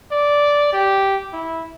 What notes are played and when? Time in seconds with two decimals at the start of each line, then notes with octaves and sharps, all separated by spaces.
0.12 D5
0.73 G4
1.33 E4